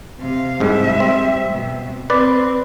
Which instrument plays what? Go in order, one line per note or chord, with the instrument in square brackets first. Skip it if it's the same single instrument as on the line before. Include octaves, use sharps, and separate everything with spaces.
[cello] C3 F5
[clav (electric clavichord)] C2 G#2 [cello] G3 E5
[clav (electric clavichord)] C4
[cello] B2
[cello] C4 [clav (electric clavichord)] B4 D5